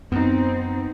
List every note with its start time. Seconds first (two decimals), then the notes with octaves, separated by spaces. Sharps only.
0.12 F#2 B3 C4 D#4